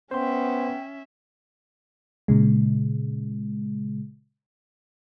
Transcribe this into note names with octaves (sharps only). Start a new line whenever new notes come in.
B3 C#4 C5 E5 G5 C6
A#2 C#3 G#3